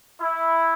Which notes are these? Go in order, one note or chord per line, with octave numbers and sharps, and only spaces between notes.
E4